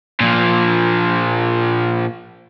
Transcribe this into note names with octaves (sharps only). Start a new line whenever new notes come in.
A#2 F3